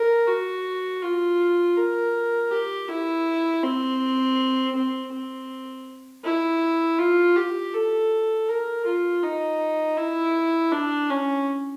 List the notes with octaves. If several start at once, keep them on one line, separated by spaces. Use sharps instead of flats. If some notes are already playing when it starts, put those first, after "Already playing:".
Already playing: A#4
F#4
F4
A#4
G4
E4
C4
C4
C4
E4
F4
G4
A4
A#4
F4
D#4
E4
D4
C#4